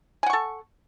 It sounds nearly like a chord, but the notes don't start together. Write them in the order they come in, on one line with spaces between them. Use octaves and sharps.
G#5 F#5 C#6 A4